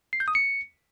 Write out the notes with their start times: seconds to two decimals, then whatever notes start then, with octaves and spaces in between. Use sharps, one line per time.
0.13 C7
0.20 G6
0.28 D#6
0.35 C#7